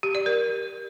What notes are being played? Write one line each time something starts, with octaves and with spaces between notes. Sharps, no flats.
G4
D5
A#4